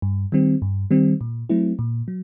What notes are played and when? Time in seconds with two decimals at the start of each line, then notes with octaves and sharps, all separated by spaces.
0.02 G2
0.32 D#3 G3 C4
0.62 G2
0.91 D#3 G3 C4
1.21 A#2
1.49 F#3 A3 C4 E4
1.79 A#2
2.08 F#3